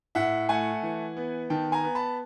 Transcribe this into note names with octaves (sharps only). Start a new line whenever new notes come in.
A2 E5 F#5
A3 F#5 G#5
E3
B3
D#3 G5 A5
G#5 A#5
B3
A5 B5